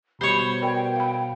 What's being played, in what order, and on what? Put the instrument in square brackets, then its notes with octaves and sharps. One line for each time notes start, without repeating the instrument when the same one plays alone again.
[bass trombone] B2 [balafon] G3 G4 [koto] C5 C#5 [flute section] B5
[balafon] A#4 D5 G#5 [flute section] G5
[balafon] F5 B5